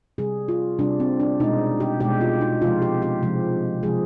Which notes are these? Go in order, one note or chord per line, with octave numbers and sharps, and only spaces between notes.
C3 G3 G#4
F4
C3 G3 D4
C4
D4
B2 G#3 D#4
G4
B2 G#3 G4
F4
D#4
C3 F3 G#3 F4
G4
G4
C3 F3 G#3
C3 F3 G#3 G#4